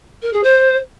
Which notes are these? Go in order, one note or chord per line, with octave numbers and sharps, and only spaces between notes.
A#4
G#4
C5